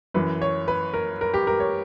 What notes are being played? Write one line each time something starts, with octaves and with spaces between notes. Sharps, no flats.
F#2 E3 B4
C#5
B4
A#4
A#4
G4
A#4
C#5